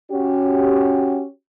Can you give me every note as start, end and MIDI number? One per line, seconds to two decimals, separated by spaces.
0.12 1.25 61
0.12 1.25 66
0.12 1.25 67